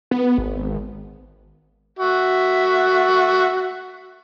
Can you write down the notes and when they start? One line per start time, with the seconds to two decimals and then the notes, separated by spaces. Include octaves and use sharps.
0.11 B3
0.38 G#1
1.99 F#4 E5